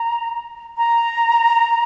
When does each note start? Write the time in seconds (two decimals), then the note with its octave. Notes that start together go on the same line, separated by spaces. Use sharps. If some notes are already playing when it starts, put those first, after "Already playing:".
Already playing: A#5
0.77 A#5